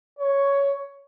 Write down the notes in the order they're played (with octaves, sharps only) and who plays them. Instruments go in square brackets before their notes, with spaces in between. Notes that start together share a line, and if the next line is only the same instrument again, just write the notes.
[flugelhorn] C#5